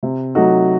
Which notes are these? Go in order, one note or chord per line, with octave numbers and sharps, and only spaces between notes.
C3
F#3 A3 D#4 F#4